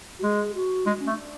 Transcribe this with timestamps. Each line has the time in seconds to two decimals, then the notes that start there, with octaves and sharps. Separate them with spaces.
0.19 F#4
0.23 G#3 G#4
0.54 F#4
0.86 G#3 D4
1.00 C#4
1.07 A3
1.12 D4